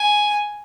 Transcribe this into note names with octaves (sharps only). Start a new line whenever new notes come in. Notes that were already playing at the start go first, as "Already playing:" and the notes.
Already playing: G#5